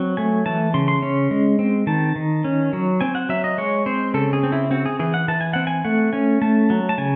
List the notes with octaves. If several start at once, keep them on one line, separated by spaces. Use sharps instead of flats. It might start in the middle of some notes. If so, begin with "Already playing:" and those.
Already playing: F#3 C4
A3 G#5
E3 A5
C#3 C6
C6
C#4
G#3
C4
D#3 A5
D#3
C#4
F#3
C4 G#5
F#5
F#3 E5
D#5
G#3 C#5
C4 C5
C#3 A4
G#4
C4
E4
C4 F#4
G#4
E3 G#4
F#5
E3 A5
G#5
C4 F#5
G#5
A3 F#5
C#4 G#5
A3 A5
F#3
A5
C#3 G#5